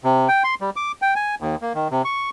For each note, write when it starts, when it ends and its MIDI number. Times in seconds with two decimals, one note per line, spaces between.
0.04 0.28 48
0.28 0.43 79
0.44 0.55 84
0.61 0.70 55
0.76 0.92 86
1.02 1.14 79
1.16 1.35 80
1.41 1.55 39
1.62 1.73 58
1.75 1.88 51
1.91 2.02 48
2.05 2.30 85